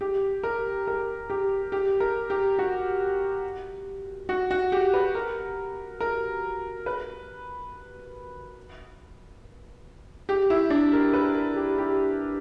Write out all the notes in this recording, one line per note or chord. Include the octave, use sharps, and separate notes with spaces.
G4
A#4
A#4
G4
G4
A#4
G4
F#4
F#4
F#4
G4
B4
A#4
A#4
B4
G4
E4
D4
A#4
B4
A#4
G4
G4